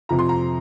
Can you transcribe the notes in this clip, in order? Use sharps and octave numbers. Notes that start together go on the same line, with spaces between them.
F2 C3 F3 A#5
C6
A#5